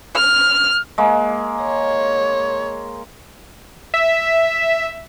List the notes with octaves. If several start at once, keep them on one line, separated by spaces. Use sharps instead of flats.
F6
G#3 A#3
C#5
E5